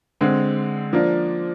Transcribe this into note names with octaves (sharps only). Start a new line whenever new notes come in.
D3 G#3 C4
F3 A#3 D4